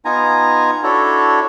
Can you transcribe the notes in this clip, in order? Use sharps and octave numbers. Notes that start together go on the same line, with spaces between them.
B3 D#4 F4 G#5 A#5
D4 E4 F#4 A4 C#5